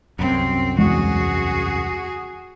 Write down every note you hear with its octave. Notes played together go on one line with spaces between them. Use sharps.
C2 F#2 C4
E2 G#3 F#4 G#4